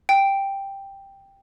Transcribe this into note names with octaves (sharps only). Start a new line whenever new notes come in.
G5